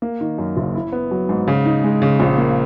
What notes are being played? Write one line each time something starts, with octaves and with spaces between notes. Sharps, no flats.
A#3
D#3
F#2
F#1
E4
B3
F#3
G#2
C#3
D#4
G#3
C#3
A#1
A#3